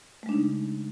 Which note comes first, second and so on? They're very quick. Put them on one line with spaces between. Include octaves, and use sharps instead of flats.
A3 G#3 D4 D#4 C#3